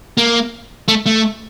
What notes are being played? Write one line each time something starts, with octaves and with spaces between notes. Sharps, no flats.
A#3
A3
A3